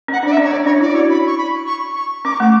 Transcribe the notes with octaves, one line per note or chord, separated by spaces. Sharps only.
C#4 F#5
D4 D5
E5
C#4
C#5
C#4 D5
D4 C#5
E4 D5
F#4 C#5
B5
C#6
B5
C#6
C#6
C#4 D6
C#6
A3 D6